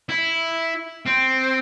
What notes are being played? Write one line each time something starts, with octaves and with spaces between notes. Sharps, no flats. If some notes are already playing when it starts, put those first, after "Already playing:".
E4
C4